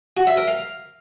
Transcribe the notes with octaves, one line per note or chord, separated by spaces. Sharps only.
F#4
E5
A#4
F5